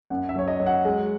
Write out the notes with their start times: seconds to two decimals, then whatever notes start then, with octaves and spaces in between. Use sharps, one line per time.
0.10 F#2 F#5
0.29 E5
0.36 F#3 C#5
0.48 D#5
0.60 F#3
0.66 F#5
0.85 G#3